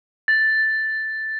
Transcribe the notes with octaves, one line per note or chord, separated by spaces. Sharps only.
A6